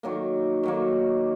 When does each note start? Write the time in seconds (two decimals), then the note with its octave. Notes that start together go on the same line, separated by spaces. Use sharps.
0.03 D#3 F#3 A#3
0.63 D#3 F#3 A#3